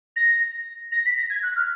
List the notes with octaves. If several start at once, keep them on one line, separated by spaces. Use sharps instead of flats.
A#6
A#6
B6
A#6
G#6
F#6
F6